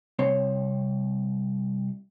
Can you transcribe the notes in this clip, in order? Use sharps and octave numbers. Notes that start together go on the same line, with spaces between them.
C2 C4 C#5 C6